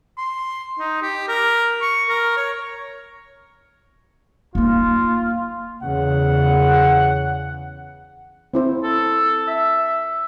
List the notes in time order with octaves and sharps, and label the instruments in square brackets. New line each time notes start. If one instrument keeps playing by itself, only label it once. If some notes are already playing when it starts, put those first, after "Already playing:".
[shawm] C6
D#4
G4
A#4
C#6
A#4
C#5
[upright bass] A#3 D#4 [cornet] F4
[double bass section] E2 C#3 [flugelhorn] F#5
[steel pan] C4 E4 C5
[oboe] A4
E5